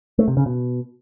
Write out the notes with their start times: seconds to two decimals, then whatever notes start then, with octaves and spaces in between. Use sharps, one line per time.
0.19 A3
0.28 C3
0.37 C#3
0.46 B2